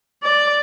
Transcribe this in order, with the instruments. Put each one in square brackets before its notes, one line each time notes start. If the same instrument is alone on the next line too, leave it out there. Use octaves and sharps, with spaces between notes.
[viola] D5